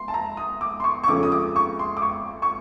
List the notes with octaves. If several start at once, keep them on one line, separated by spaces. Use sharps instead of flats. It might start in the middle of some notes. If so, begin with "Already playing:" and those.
Already playing: C6
A5
A#5
D#6
D6
C6
C#6
C#6
F2 C#3 F3 A3 C#4 D6
D#6
D6
C#6
C6
D6
C#6
C#6